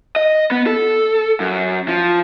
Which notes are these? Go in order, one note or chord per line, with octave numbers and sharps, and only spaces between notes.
D#5
B3
A4
F#2
F3